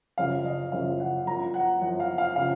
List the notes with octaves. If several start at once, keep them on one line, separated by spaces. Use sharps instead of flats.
F#2 C#3 F3 F5
D#5
F#2 C#3 F3 F5
F#5
F#2 F3 A#5
F#5
F#2 F3 F#5
F5
F5
C#3 F3 F5